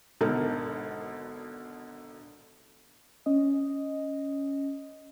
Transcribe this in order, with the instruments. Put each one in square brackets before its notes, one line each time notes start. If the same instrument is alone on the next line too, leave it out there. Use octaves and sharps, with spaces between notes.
[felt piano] G#1 B2 D3 A4 A#4 A5
[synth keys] C#4 D#5